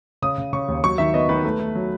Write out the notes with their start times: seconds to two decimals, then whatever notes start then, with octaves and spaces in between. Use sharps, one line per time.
0.22 C#3 D#6
0.38 C#3
0.53 C#3 C#6
0.68 D#2
0.84 F#3 C#6
0.98 D#3 E5
1.14 B3 D#5
1.29 D#3 B4
1.44 A3
1.60 A3
1.75 F#3